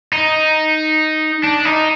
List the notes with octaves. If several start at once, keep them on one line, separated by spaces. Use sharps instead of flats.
D#4
D4
D#4